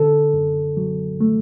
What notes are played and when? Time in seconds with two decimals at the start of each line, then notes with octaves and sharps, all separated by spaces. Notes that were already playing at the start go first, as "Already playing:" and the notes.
Already playing: D3 A4
0.34 F#2
0.77 F#3
1.21 A3